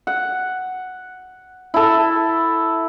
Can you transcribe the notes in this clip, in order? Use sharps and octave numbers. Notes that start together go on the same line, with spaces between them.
F#5
E4 A4